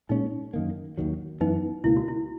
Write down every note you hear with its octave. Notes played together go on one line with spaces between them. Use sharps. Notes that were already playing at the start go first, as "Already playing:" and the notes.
A#2 G#3 C#4 D#4
F#2 D#3 A#3
D#2 D#3 F#3
F#2 E3 B3 D#4
C#2 B2 A#3 E4
F#4
E4